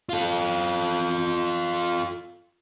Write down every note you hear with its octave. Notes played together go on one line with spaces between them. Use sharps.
F4 A4